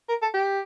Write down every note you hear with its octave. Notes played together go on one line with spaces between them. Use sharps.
A#4
A4
G4